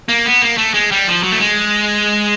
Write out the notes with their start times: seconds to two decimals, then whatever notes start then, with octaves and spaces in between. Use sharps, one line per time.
0.09 A#3
0.25 B3
0.42 A#3
0.57 A3
0.74 G#3
0.91 G3
1.07 F3
1.23 F#3
1.32 A3
1.40 G#3